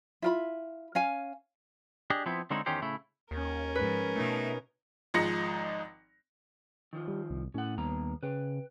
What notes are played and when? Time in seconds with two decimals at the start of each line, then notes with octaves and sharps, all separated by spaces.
0.22 E4 F4 B5
0.95 C#4 F5 G#5
2.10 D4 G4 G#4 D#5
2.26 F3 B3 C4 E4
2.50 D3 G#3 C4 C#4 D#4 E4
2.66 E2 D#3 C#4 D#4 G4 C5
2.82 A2 C#3 A3 E4
3.31 D#2 C#4 A#4
3.75 G#2 F3 B4
4.16 B2 A3 D#4
5.14 G#1 F3 G#3 D#4 A#6 C#7
6.93 D#3 F3 F4
7.08 G3
7.30 C2
7.54 A2 C#4 F#5
7.78 D#2 G3 B3 A#5
8.23 C#3 B4 G5